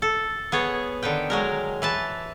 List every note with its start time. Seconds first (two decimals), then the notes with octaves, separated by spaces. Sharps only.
0.02 A4
0.52 B3 G#4 C#5
1.03 D3 D#3 B4 G5
1.30 F#3 G#3 A#4
1.82 E3 B4 A5